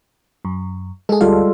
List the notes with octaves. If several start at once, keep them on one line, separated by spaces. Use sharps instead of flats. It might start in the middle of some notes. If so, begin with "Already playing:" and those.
F#2
G#3 G#4 A4
D2 G3 F4 A4 F5